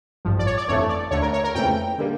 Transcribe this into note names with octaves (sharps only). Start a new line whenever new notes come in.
A1 G2 F3
D5
C#5
D5
G1 F2 E3 A3 C#5
D5
D2 D3 A3 C#5
A#4
C#5
A#4
F2 C#3 E3 A3 G5
D3 G3 A#3